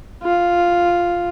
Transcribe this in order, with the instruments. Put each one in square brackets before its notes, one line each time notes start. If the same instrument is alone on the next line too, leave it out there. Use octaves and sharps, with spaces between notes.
[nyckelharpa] F4